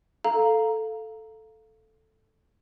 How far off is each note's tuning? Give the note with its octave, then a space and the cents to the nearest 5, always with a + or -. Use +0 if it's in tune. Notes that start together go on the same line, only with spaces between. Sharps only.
A4 +0 F5 +0 A#5 +0